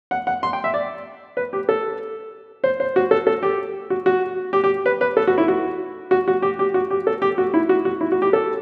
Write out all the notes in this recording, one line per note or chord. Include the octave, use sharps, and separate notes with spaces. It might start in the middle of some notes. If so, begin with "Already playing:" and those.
F#5
F#5
C6
G5
E5
D5
B4
G4
A4
C5
C5
F#4
A4
A4
G4
F#4
F#4
G4
G4
B4
B4
A4
F#4
E4
F#4
F#4
F#4
G4
G4
F#4
G4
A4
G4
F#4
E4
F#4
F#4
E4
F#4
G4
A4